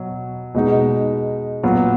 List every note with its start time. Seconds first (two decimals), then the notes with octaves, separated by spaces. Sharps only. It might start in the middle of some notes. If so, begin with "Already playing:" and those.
Already playing: B2 F#3
0.55 B2 G#3 D#4
1.63 A#2 F#3 B3 F4